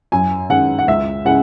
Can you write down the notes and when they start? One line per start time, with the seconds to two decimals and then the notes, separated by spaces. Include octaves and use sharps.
0.12 F#2 G#5
0.50 D#3 G#3 C#4 F#5
0.79 F#5
0.88 C#2 E5
1.25 C#3 G#3 C#4 E4 F#5